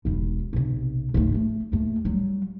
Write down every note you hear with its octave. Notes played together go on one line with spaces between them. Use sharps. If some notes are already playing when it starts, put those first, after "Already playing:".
E1 B1
B1 C3
G#2 A3
A3
D#2 A3
F#3 G3